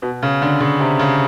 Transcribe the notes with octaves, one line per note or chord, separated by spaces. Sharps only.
B2
C#3
D3
C#3
C3
C#3